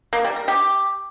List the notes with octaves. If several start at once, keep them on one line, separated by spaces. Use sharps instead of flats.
A#3
G3
A#4
G4